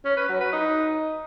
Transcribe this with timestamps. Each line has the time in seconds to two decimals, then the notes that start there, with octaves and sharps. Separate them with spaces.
0.05 C#4
0.17 B4
0.29 F#3
0.41 B4
0.53 D#4